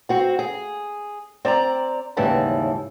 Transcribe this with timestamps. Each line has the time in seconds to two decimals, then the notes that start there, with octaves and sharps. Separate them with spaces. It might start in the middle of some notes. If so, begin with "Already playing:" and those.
0.09 C4 F#4 C5
0.39 G#4
1.45 C4 D5 G#5 A#5
2.17 D#2 G#2 C#3 E3 G3 A5